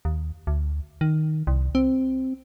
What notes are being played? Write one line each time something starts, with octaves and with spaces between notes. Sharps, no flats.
D#2
D2
D#3
C2
C4